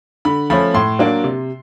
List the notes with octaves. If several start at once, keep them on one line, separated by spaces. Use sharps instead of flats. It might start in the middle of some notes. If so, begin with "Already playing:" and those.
D3 B5
F3 A3 C#4 B5
A2 C6
F#3 A#3 D4
C3